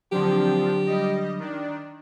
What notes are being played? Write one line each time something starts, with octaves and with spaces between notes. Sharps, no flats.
D3 F3 F#3 C4 D4 G4
G3 D#5
D#3 D4